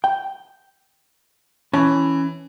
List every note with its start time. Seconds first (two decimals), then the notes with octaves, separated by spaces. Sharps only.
0.04 G5
1.73 E3 C#4 A5